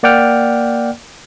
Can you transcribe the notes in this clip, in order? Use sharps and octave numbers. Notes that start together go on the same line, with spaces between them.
A#3 D5 F#5 G5 F6